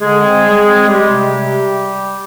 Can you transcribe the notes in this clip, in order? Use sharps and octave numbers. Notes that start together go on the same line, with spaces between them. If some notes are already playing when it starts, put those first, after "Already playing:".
D3 G#3 G#4
C4
G3
C4
G3 G#3 G4
C3
C3